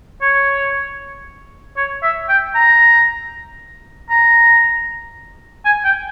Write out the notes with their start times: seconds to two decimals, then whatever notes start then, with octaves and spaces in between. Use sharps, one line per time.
0.22 C#5
1.77 C#5
2.03 E5
2.29 G5
2.55 A#5
4.10 A#5
5.65 G#5
5.85 G5